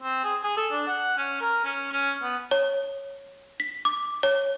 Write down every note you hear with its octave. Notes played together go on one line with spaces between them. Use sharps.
C4
G#4
G#4
A4
D4
F#5
C#4
A#4
C#4
C#4
B3
C#5
B6
D6
C#5